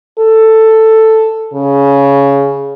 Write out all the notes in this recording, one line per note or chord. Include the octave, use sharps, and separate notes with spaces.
A4
C#3